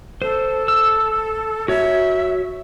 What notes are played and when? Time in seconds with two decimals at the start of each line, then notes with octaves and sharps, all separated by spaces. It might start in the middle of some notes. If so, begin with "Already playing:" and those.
0.22 A4 C5
0.68 E6
1.68 F#4 C#5 E5